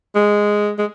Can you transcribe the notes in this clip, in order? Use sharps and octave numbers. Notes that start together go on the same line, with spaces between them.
G#3
G#3